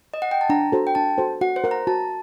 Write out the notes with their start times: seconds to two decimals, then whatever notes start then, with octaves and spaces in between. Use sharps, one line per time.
0.14 D#5
0.22 F#5
0.31 G5
0.41 A5
0.50 D4 A#5
0.72 F#4 A4 C5
0.87 G5
0.95 D4 A5
1.18 F#4 A4 C5
1.41 F#4 F#5
1.56 C5
1.64 A#4 F#5
1.71 A#5
1.87 F#4 A5